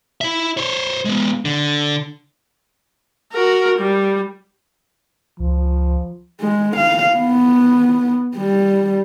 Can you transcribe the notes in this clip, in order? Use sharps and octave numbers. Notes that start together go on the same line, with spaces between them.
E4 E5
C5 C#5
G#3 B3
D3
F#4 A#4
G3
C#2 F3
G#3
F5
B3
G3